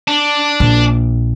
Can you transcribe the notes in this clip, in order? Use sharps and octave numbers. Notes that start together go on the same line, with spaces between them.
D4
A#1